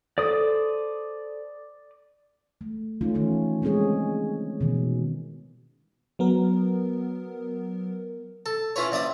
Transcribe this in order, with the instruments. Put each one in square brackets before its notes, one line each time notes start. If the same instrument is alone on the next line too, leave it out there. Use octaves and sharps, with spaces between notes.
[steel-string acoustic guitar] A4 C5 [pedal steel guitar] D5 D#6
[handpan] A3
A3 C#4 D#4 F4
D#3 E3 C#4
G3 G#3 C4 C#4 G#4 C#5
B2 D#3 E3
[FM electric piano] F#3 B3 A#4
[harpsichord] A4
C#4 E4 F4 B4 C#5
A#1 D5 E5 D#6